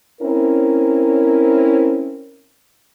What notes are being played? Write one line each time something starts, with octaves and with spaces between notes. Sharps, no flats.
C4 C#4 E4 A#4